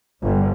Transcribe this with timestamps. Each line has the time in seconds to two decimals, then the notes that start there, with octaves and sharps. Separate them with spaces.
0.22 G1